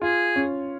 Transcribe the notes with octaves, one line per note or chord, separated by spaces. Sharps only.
F4 G#4
C#4